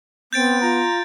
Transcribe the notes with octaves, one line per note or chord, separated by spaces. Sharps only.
B3 C4 G6 A6 D7
F4 A#5